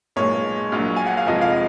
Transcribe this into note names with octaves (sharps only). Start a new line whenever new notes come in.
B1 A#2 G#3 C#5
A#1 A#2 F#3
G#5
F#5
F5
F1 F2 F3 G#3 D#5
F5